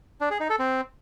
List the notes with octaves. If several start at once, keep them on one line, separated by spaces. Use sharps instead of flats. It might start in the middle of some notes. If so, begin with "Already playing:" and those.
D4
G#4
D#4
A4
C4